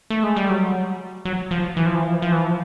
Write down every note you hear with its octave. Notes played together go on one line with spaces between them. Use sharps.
A3
G#3
G3
F#3
F#3
F3
E3
F3
E3
F3
E3
F3
E3
F3